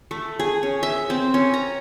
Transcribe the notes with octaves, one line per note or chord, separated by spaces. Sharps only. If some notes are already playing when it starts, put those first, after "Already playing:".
A3
G#4
C#4
E5
C4
C#4
A#5